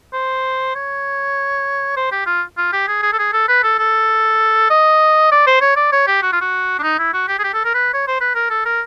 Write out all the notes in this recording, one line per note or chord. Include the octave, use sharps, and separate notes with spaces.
C5
C#5
C5
G4
F4
F4
G4
G#4
G#4
A4
G#4
A4
B4
A4
A4
D#5
D5
C5
C#5
D5
C#5
G4
F#4
F4
F#4
D4
D#4
E4
F#4
G4
G#4
G4
A4
A#4
B4
C#5
C5
B4
A#4
A4
A#4